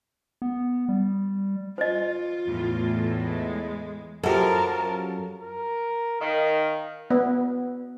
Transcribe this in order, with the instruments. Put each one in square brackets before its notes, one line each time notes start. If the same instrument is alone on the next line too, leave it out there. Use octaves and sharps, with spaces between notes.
[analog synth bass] B3
G3
[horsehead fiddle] F4 [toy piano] C5 D#5
[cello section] E2 A2 E3
[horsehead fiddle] G#3
[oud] F#2 F3 [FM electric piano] F#4 G4 A4 [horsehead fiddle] A#4 A5
[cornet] A#4
[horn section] D#3 [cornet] F5
[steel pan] B3